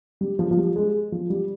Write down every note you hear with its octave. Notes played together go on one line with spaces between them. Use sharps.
G3
F3
F3
G3
G#3
F3
G3